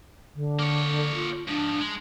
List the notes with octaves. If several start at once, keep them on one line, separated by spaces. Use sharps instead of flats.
D3
A#3 C#5
F4
G#2 F3 D4
G#3